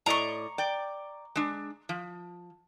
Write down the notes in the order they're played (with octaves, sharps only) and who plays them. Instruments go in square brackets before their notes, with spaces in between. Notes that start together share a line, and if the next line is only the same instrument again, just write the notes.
[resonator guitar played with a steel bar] A2 D5 D#5 [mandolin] A#5 C#6
[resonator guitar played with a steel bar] D5 G5
G#3 D4
F3